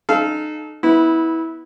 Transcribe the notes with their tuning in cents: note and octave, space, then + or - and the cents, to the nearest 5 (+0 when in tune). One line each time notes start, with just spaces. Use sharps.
D#4 -30 A4 -30 F5 -20
B3 +0 E4 -20